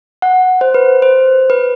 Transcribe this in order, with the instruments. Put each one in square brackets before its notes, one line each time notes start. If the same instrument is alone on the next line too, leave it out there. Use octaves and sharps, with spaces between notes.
[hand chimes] F#5
C5
B4
C5
B4